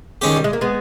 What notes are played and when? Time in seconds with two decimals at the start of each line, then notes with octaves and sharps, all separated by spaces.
0.22 D#3 G#3 C#4 G4
0.36 G3
0.44 G#3
0.53 A#3
0.61 G#3 B3